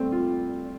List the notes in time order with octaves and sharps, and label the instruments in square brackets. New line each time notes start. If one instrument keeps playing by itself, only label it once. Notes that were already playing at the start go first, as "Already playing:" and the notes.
Already playing: [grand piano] G3 A3 C4
F4